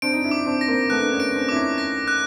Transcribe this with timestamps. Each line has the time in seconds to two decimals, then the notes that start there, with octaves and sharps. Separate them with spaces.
0.02 C4 D4 D7
0.13 D#4
0.24 D4 E4
0.31 D6
0.46 C4 D4
0.61 A#6
0.68 A#3 C4
0.90 A3 B3 F#6
1.01 D4
1.12 B3 C#4
1.20 D7
1.34 C4 D4
1.49 E4 D6
1.56 C#4 D#4
1.78 A#6
2.08 F#6